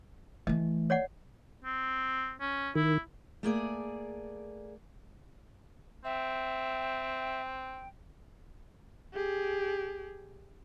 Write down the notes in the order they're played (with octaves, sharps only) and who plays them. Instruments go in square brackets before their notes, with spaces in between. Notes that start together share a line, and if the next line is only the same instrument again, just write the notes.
[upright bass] E3 A3 [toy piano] D#5
[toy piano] C#5 D5 F#5
[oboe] C4
C#4
[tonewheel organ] D#3 [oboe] E4
[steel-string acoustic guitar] A3 A#3 G#4 D5
[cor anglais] C4 [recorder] E5 [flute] G5
[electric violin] G4 G#4